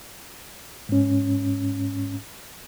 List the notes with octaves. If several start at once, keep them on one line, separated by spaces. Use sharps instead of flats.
G#2 C#4